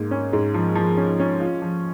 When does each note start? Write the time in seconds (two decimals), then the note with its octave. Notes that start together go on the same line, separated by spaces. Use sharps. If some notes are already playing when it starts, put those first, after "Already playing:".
Already playing: G#2 A#3
0.11 C#4
0.33 G#2
0.54 F3
0.75 F3
0.97 C#4
1.20 C#4
1.40 F4
1.62 F3